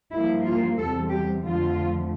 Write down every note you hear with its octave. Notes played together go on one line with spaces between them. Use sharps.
G2 F3 A#3 E4
F4
E2 C3 G3 A4
G4
F2 D3 F3 A3 F4